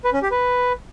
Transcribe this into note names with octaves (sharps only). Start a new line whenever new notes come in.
B4
C#4
G4
B4